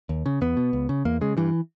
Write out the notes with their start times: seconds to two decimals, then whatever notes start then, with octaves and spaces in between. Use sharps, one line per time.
0.09 D#2
0.26 C#3
0.41 E2 B3
0.57 B2
0.73 C#2
0.89 C#3
1.05 E2 A#3
1.21 C#3 G#3
1.37 G2 E3